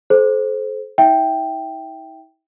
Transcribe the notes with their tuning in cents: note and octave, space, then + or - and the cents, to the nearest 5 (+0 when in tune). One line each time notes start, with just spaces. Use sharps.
A4 -40 C5 +0
E4 -45 E5 +0 G5 +0